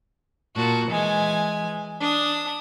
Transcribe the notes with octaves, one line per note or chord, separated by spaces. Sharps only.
A#2 F#4 A5
E3 G#3 G#5
D4 D#6